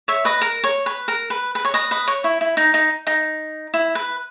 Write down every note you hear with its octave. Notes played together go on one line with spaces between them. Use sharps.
C#5 E5
B4 D#5
A#4
C#5
B4
A#4
B4
B4
C#5
B4 D#5
B4 D#5
C#5
E4
E4
D#4
D#4
D#4
E4
B4